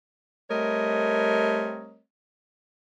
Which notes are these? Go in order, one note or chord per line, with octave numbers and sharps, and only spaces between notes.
G3 A3 C4 A#4 C#5 D#5